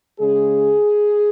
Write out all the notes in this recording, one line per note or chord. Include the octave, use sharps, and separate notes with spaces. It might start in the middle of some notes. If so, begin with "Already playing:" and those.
C#3 G#3 C#4 G#4